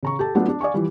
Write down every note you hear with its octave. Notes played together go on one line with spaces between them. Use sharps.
C#3 A#5 C#6
G4 A4 A5
F#3 A3 B3 D4 F4
D4
D5 F5 G#5 C#6
E3 F3 G3